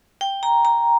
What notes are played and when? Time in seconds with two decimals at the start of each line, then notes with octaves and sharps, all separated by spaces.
0.21 G5
0.43 A#5
0.65 A#5